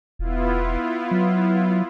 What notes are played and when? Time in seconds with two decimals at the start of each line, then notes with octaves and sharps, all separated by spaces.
0.19 E1 B3 E4 F4
1.11 F#3